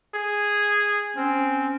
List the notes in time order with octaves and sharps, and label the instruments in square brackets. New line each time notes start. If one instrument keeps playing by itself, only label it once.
[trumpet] G#4
[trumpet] C4 [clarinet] C#4